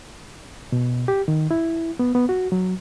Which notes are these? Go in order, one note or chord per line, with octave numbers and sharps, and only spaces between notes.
B2
G4
D#3
E4
B3
B3
F#4
F#3